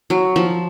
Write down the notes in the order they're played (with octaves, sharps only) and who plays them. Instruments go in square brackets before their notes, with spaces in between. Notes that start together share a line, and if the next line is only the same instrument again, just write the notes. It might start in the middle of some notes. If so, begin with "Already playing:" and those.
[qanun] F#3
F3